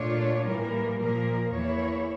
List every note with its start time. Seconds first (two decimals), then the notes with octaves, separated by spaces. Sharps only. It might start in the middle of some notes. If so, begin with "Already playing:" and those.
Already playing: A#2 A3 D4 F4 C#5
0.45 A2 E3 G3 A#3 A#4
0.99 A#2 F3 A#3 A#4
1.52 E2 E3 A#3 E4 C#5